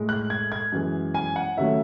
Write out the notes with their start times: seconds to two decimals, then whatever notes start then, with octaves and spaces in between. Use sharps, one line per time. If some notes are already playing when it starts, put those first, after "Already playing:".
Already playing: A2 G#3
0.09 F#6
0.30 G#6
0.52 G#6
0.72 F#2 E3 G#3
1.15 G#5
1.36 F#5
1.57 D#2 C#3 F#3 A3 E5